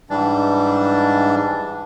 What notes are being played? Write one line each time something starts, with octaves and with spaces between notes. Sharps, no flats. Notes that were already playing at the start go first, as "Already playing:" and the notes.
G#2 E3 G3 D4